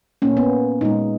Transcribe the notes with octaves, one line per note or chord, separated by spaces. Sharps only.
A#2 A#3 C#4
B3
A#2 G#3 D#4